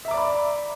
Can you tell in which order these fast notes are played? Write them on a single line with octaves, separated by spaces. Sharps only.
E5 A#5 D6 D5 B5